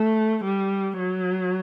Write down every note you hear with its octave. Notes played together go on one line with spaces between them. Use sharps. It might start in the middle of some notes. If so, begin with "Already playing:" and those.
Already playing: A3
G3
F#3